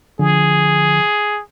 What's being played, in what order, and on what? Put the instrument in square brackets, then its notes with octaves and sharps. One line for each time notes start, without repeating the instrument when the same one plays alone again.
[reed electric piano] D3 F3 [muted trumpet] G#4